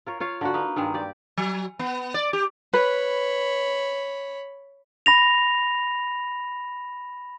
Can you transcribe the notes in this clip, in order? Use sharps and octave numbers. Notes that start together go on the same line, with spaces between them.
F4 A#4 C#5
F4 C#5 F5
D3 A#3 F#4
A#3 D#4 B4
G2 D#3 G#3
G4 D5
F#3
B3
D5
G4
B4 C#5 B5
B5 A#6 F7